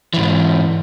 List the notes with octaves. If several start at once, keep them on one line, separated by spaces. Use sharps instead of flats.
F2 G#2 E3